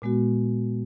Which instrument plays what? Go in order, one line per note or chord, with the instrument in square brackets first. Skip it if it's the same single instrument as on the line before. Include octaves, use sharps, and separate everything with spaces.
[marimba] A#2 G#3 B3 F#4